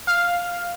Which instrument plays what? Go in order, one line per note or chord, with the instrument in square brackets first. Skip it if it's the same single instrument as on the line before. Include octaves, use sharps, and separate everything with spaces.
[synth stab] F5